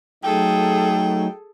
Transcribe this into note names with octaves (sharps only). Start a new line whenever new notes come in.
F#3 A3 D#4 G#4 A4 G5